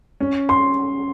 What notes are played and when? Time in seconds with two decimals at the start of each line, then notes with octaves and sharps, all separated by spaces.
0.20 C#4
0.49 C6